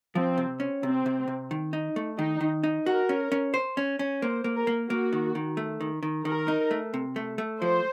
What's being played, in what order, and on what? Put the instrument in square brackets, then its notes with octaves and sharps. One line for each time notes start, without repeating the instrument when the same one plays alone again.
[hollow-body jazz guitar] F3 [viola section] C4
[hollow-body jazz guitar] C3
C#4
[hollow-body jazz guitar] C3 [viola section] C4
[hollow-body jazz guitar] C3
C3
D#3
D#4
A3
[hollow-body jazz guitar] D#3 [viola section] D#4
[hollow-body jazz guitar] D#3
D#4
[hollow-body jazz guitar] F#4 [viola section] A#4
[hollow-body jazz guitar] C#4
C#4
C5
C#4
C#4
[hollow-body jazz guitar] A#3 [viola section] C5
[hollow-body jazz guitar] A#3
[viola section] A#4
[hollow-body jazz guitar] A#3
[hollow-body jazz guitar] A#3 [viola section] F#4
[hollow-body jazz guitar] D#3
D#3
A3
D#3
D#3
[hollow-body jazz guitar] D#3 [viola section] A#4
[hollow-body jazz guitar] D#4
A3
C3
A3
A3
[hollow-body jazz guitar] F3 [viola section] C5